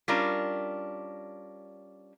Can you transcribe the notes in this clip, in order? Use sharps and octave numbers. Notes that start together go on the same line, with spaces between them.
G3 C#4 D4 F4 A#4